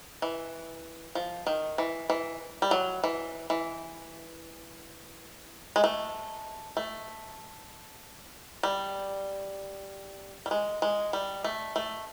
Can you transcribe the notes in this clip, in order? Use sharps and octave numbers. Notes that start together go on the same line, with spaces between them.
E3
F3
D#3
E3
E3
G3
F#3
E3
E3
G#3
A3
A3
G3
G3
G#3
G#3
G3
A3
A3